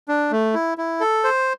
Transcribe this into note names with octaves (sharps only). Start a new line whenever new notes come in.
D4
A3
E4
E4
A4
C5